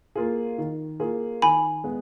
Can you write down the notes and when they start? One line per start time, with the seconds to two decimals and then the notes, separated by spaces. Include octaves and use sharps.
0.16 A#3 F4 G#4
0.58 D#3
1.00 A#3 F4 G#4
1.42 D#3 G#5 B5
1.84 G#3 B3